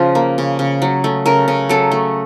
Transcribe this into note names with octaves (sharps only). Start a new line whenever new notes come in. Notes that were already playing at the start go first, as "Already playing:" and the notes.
Already playing: C#3 F3
A#3
C#3
C#3
F#3
A3
C#3 A#4
C#3
F#3 A4
A3